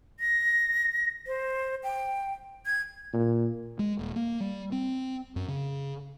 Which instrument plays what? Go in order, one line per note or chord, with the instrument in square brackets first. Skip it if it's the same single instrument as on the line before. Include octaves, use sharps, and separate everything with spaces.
[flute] A#6
C5
G5
G#6
[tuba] A#2
[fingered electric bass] G#3
D#1
A#3
G3
C4
F#2
C#3